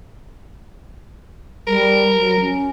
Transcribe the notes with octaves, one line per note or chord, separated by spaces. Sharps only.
G3 A#4
F#3
C#4